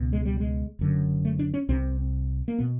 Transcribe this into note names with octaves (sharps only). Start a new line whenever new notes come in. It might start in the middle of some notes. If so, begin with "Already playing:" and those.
Already playing: C#2 B2
G#3
G3
G#3
F#1 F#2 D3
A3
D4
C#4
C2 C3 C4
A#3
B2 B3